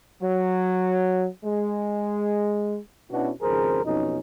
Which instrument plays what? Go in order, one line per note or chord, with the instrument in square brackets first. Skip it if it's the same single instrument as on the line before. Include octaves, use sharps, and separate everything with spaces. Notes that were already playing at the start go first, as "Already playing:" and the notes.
[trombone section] F#3
G#3
B2 B3 C#4 D4 E4 F#4
G#1 F2 C#3 G#4 A#4 C5
B1 F2 B2 C#4 D#4